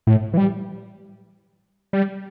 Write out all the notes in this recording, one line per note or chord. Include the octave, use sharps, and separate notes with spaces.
A2
E3
G3
G3